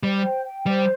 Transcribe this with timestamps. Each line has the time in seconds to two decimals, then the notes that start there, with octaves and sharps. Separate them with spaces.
0.03 G3 C5
0.25 G5
0.45 G5
0.66 G3 C5